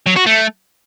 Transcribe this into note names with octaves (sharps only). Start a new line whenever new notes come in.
F#3
F#4
A3